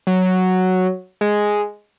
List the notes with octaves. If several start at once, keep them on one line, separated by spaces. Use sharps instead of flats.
F#3
G#3